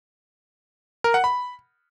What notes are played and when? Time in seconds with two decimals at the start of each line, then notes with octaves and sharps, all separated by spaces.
1.04 A#4
1.14 F#5
1.24 B5